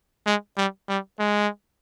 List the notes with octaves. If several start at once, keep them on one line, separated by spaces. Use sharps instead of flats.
G#3
G3
G3
G#3